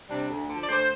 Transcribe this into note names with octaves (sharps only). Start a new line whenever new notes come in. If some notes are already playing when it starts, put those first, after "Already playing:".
C3 G3 D4
D2
D3 F3
D5
D2 C5